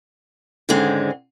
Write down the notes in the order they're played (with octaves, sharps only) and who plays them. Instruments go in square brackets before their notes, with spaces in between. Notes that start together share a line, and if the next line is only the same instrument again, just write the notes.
[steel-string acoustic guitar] G#2 D3 D#3 G#3 C4 C#4